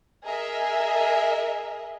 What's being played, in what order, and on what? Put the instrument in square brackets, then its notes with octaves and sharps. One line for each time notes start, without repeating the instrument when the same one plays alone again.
[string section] G#4 A#4 D#5 E5